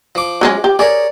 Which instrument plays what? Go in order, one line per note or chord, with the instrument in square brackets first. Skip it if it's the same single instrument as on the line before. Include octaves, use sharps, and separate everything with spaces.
[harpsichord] F3 D6
[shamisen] F#3 G#3 C#4
G4
[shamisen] G#4 [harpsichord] A#4 C#5 D5